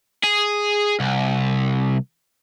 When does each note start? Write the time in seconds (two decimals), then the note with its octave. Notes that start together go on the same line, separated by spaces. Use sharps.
0.23 G#4
1.00 C2